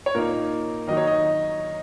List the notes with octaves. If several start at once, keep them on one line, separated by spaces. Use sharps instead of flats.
C#5
A#2 A#3 D#4 A#4
D#3 F#3 D#4 D#5
C#5
D#5